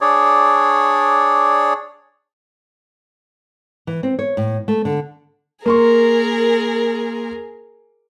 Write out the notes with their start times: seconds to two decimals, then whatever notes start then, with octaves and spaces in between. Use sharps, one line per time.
0.01 D4 G#4 C#5 D5
3.87 E3
4.03 C4
4.19 C#5
4.37 A2
4.68 A3
4.85 D3
5.66 A#3 G#4 A#4 C6 C#6